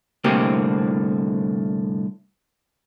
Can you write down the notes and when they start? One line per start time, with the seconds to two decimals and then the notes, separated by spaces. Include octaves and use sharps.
0.24 C2 A2 D3 A#3 C4 G4